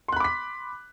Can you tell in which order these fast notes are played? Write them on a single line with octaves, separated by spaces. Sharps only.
C6 F#6 B5 D6 B6